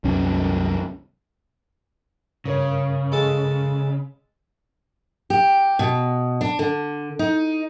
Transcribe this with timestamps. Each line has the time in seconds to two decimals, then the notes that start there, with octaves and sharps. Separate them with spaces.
0.04 C2 F#2 C#4
2.46 G2 C#3 A#4 C#5
3.12 G#3 A4 A5
5.30 G4
5.79 B2
6.41 D4
6.59 D3
7.19 D#4